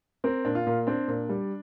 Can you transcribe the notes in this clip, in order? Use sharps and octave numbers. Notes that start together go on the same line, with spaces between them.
C4 A#4
A#2 D4
F4
A#2
C4 D4
A#2
G3